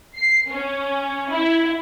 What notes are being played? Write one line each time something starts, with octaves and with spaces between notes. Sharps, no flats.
C7
C#4
E4